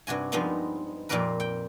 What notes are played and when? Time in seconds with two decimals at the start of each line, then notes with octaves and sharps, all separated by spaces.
0.07 G2 C3 F#4 G#5
0.32 G2 F3 G#3 B3 C4 D#4
1.09 F2 A#2 C4 G4 A#4 B4
1.40 G5